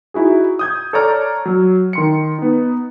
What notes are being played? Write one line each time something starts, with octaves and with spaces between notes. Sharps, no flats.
D#4 E4 F#4 G#4
D#6 G6 G#6
A4 C#5 D5 A#5 F6
F#3
D#3 C6 C#7
B3 D#4